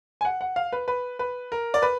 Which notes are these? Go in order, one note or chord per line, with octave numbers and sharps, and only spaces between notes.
G#5
F#5
F#5
F5
B4
B4
B4
A#4
D5
B4